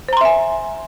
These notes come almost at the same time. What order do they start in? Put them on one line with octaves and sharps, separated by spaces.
C5 A#5 C6 E5 G#5